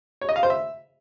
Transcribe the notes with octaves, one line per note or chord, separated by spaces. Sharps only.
C#5
D#5
F5
C5
E5